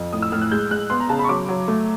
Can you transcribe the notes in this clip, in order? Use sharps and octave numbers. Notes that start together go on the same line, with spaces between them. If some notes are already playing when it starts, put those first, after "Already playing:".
Already playing: F2
A2 D#6
E6
A2 F6
F#6
G#3 G6
G#3 F#6
B3 C6
A#5
C#3 A5
B5 C#6
F#3 D6
F#3
A3